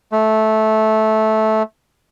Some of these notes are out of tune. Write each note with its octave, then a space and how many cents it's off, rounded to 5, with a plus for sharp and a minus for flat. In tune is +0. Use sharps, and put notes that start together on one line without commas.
A3 -15